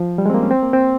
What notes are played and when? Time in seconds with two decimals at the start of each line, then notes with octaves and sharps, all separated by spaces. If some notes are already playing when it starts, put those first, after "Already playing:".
Already playing: F3
0.18 G3
0.26 G#3
0.30 C4
0.34 A#3
0.43 C#4
0.51 C4
0.62 A#3
0.73 C4